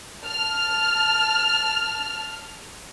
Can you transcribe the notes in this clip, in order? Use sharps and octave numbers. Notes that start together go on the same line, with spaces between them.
A5 F6